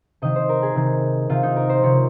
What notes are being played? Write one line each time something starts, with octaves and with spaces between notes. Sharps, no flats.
C3 D#3 D#5
C5
A#4
G#4
C3 D#3
C3 D#3 F4
D#4
A#4
C5
C3 D#3 C#5